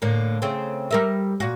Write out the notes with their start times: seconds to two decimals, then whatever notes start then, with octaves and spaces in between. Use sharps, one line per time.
0.02 A2 D3 A#3
0.42 C#3 A3 C4
0.91 G3 A#4 E5
1.40 A#2 F#4